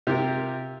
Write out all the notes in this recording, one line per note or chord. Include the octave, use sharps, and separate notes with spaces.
C3 F4 G4 A#4